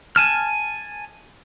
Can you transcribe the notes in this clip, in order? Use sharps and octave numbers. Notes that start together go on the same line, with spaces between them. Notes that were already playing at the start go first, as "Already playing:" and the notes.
G#5 A5 F6